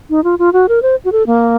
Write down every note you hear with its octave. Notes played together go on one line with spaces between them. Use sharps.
D#4
F4
F4
F#4
A#4
C5
F#4
A4
A#3